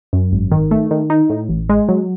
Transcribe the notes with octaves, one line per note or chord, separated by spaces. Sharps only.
F#2
G#1
D#3
A3
D#3
D#4
A2
A1
G#3
F#3